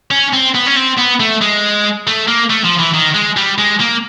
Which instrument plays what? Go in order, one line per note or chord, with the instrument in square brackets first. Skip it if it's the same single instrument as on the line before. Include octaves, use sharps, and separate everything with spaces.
[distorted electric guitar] C#4
C4
B3
C#4
C4
B3
A3
G#3
A3
A#3
A3
F3
E3
D#3
G#3
G3
G#3
A#3